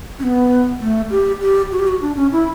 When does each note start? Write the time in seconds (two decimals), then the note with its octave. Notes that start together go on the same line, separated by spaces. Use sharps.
0.19 C#4
0.23 B3
0.80 A3
1.10 G4
1.41 G4
1.72 F#4
1.79 G4
1.87 F#4
2.01 D4
2.16 C#4
2.32 E4